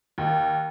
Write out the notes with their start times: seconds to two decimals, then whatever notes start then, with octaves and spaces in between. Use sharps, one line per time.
0.18 D#2